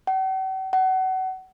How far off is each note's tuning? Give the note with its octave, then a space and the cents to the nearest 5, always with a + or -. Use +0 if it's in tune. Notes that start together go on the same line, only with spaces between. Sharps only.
F#5 +45
F#5 +30